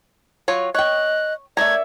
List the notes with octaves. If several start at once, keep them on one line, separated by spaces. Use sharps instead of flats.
F#3 F4 C#5
C#5 D#5 G5 F#6
A3 C#5 D5 E5 A#5 G#6